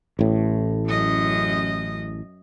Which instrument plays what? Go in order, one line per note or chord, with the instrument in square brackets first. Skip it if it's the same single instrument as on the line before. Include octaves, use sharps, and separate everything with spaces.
[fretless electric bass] A1 A2
[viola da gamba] F#2 D#5